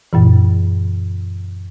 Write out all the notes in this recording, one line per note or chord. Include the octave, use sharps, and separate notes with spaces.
F#2 A#2 E3